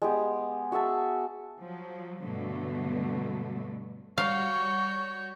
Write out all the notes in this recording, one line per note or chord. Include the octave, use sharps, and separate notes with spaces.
G#3 B3 G4
F#4 G#4 E5 A5
F3 F#3
G2 B2 D3 F#3 A3
G3 F#4 C#5 F5 C#6 G6